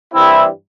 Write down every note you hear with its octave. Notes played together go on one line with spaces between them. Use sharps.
G2 E3 G3 C4 E4